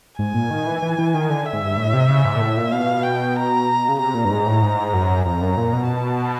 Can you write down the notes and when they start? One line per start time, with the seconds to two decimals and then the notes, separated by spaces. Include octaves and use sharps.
0.19 G#2 G#5
0.34 A#2
0.51 D#3
0.67 E3
0.82 E3
0.98 E3
1.14 D#3
1.30 D3
1.46 E5
1.53 G#2
1.61 G2
1.77 A2
1.94 C3
2.09 C#3
2.25 G#2
2.36 A#2
2.41 A2
2.57 A#2
2.72 B2 F5
3.03 G5
3.36 A#5
3.89 C#3
3.99 C3 A#5
4.15 A#2
4.25 G2
4.31 G#2
4.47 A2
4.62 G#2
4.94 F#2
5.26 F2 A#5
5.41 F#2
5.57 A#2
5.73 B2
5.88 A5